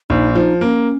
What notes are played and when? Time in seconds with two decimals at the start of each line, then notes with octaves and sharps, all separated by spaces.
0.10 A#1 D#4
0.35 F3 D#4
0.61 A#3 C#4